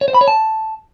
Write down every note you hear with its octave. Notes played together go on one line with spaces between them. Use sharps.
C#5
C5
B5
C#5
A5